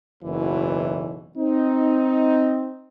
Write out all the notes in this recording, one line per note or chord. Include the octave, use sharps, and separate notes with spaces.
F#1 B1 E2 B2 E3
C4 D#4